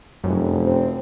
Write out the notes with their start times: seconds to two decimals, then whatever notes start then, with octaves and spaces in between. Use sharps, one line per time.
0.24 F1 F#2
0.66 C4